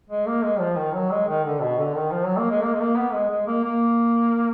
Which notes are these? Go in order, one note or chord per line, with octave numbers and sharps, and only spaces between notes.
G#3
A#3
G#3
F3
D#3
F#3
G#3
D#3
D3
B2
D3
D#3
F3
F#3
A#3
G#3
A#3
G#3
A#3
B3
G#3
G#3
A#3
A#3